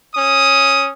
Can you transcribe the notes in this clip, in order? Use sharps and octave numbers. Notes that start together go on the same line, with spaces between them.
C#4 D#6